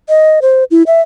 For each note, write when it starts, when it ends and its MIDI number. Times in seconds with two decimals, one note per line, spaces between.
0.09 0.39 75
0.42 0.64 72
0.71 0.83 64
0.87 1.01 76